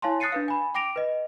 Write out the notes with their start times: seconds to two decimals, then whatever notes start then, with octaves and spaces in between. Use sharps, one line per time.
0.02 E4 C#5 F5 G#5 A5 C6
0.20 D#6 F#6 A6 C7 C#7 D#7
0.32 D4 B4 F5
0.48 G#5 B5
0.75 G5 D6 A#6 D7 F7
0.96 B4 D#5